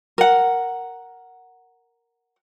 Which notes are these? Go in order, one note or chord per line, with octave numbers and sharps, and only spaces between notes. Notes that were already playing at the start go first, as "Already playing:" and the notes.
A#4 F#5